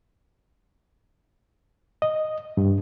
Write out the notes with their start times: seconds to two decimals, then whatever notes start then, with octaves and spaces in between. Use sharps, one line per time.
2.02 D#5
2.57 G2